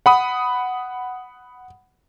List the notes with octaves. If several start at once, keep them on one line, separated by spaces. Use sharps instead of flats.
F#5 B5 D#6